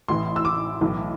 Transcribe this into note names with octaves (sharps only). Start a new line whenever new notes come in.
A1 A2 E3 C6
E6
D6
B1 A2 E3